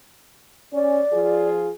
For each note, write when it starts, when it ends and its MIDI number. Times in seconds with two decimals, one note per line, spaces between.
0.73 1.01 61
0.73 1.48 74
1.12 1.71 53
1.12 1.71 65
1.12 1.71 68